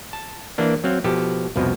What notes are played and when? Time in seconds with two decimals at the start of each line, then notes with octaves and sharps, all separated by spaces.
0.13 A5
0.58 E3 A#3 D4
0.84 F#3 C4 F5
1.04 B2 F3 G4 A4
1.56 C2 F2 B2 F3